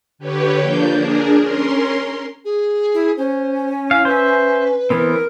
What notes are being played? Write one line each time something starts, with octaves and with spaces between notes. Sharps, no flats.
D3 G4 B4 C#5
F3 A#3 D4 G6
D4 G#4 A#4
C#4 A#4 C6
G#4
E4
C#4 C5
E4 F5
B4 C5 E5
E3 B3 C4 A#4